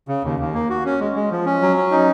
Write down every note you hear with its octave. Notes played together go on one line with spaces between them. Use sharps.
C#3
D#2
D#2
A#3
F#4
C#4
G#3
G#3
F3
C#4
F#3
C#4
D#4